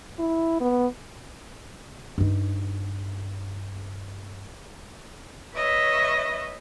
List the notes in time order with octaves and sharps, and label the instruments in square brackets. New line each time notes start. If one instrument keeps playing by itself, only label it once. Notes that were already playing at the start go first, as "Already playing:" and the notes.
[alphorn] E4
B3
[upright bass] G2 D#4
[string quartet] B4 C#5 D#5 E5